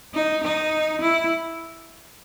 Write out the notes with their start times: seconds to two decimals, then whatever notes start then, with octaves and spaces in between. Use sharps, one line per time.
0.14 D#4
0.43 D#4
1.01 E4